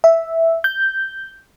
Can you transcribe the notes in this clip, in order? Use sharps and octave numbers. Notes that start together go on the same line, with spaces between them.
E5
G6